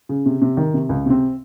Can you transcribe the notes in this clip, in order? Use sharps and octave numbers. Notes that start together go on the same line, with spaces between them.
C#3
C3
C3
D#3
C3
C#2
C3 C4